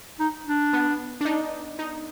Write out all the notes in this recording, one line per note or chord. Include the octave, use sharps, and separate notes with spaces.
D#4
D4
B3
D4
D#4
D#4